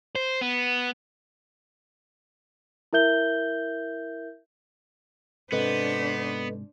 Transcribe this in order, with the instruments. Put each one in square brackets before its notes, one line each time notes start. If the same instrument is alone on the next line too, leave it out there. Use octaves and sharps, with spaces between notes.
[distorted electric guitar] C5
B3
[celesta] E4 A#4 E5 G6 G7
[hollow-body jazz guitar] G#2 C3 [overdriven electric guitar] B3 [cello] D4 C5 [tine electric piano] A4 B4 D#5